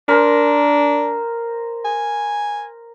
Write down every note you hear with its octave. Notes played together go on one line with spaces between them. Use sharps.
D4 A#4 C5
G#5